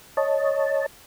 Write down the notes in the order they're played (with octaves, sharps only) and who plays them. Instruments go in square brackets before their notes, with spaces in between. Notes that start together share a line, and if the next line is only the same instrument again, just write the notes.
[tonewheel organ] C#5 D#5 A5